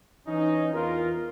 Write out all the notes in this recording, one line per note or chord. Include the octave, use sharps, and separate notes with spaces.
E3 C#4 D#4
E2 F4 A#4